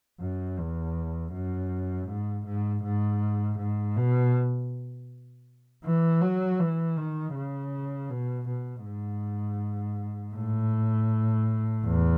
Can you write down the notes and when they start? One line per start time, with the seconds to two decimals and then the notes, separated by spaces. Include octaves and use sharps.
0.20 F#2
0.58 E2
1.33 F#2
2.08 G#2
2.45 G#2
2.84 G#2
3.58 G#2
3.96 B2
5.85 E3
6.22 F#3
6.60 E3
6.97 D#3
7.34 C#3
8.10 B2
8.48 B2
8.85 G#2
10.35 A2
11.86 E2